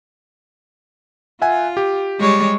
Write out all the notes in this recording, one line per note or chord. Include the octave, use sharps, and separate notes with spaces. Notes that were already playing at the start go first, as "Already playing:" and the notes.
F4 E5 F#5 G#5
G4
G3 G#3 C#5